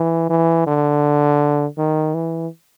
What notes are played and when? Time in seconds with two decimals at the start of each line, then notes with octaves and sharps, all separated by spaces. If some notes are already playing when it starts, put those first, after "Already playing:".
Already playing: E3
0.29 E3
0.67 D3
1.78 D#3
2.14 E3